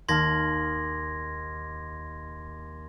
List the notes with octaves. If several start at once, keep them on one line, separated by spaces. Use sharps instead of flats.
D#2 A5 C6 F6 G#6 A#6